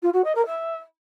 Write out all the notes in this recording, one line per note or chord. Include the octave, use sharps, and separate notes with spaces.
F4
F#4
D#5
A#4
E5